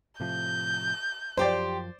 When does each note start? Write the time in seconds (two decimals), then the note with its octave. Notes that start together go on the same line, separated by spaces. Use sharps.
0.20 A2 C3 F3 G6
1.37 F#2 F3 G4 C5 D5 C6